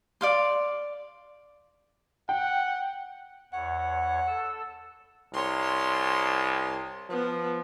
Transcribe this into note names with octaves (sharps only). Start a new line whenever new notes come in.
D5 F5 C6
F#5 G5
E2 C#5 F#5
A4 E6
C2 C#5 C6
F3 B3